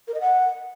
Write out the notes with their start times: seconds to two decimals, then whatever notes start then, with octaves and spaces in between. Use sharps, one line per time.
0.07 A#4
0.14 D#5
0.20 F#5